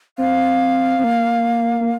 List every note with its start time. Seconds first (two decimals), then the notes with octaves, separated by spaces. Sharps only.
0.18 C4 F5
0.98 C4
1.04 A#3
1.80 A#3